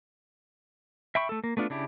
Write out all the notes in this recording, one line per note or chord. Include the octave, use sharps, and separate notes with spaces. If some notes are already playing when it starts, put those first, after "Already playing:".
E5 G5 B5 C#6
A3 A4
A#3
A3 B3 D4 F4
C#3 D4 E4 G4